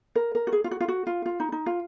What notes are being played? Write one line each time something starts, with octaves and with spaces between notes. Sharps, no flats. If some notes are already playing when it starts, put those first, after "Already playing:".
A#4
A#4
F#4
G#4
F4
F#4
F4
F#4
F4
F4
D#4
D#4
F4